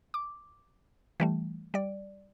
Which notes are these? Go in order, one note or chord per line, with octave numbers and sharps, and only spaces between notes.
D6
E3 G3 A3
G3 D5